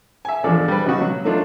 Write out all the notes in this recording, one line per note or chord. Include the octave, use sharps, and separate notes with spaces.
E5 G#5
G#1 E2 F3 D4 A4 D5
G3 B4
B1 C#3 F#4 D#5
F#3
F#3 A3 D4 D#4 F4